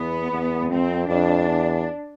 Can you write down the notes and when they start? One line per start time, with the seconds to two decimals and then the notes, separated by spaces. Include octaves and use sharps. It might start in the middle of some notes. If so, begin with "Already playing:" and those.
Already playing: E2 B3
0.31 E2
0.70 F2 C4
1.08 F2 D4
1.48 E2